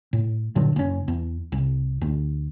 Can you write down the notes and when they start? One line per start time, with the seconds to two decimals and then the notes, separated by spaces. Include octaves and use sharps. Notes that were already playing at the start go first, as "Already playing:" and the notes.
0.13 A2
0.56 G2 A#2 D3 F#3
0.76 F#1 C#4
1.08 E2
1.52 C2
2.02 D2